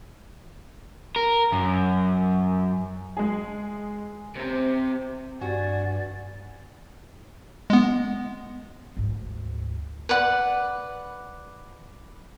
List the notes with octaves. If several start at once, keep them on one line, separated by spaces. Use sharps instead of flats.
A#4
F#2
G#3 G#4
C3 C4
G2 F#4 D5 G#5
G#3 B3
D2 G#2
B4 D5 F#5